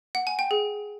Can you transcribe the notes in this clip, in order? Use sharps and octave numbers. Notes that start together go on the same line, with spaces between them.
F#5
G#5
G5
G#4